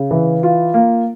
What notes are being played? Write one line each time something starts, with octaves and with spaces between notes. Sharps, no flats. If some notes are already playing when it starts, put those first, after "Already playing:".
Already playing: C#3
E3
F4
A#3